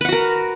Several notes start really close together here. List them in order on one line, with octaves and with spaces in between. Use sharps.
B4 F#5 F#4 A#4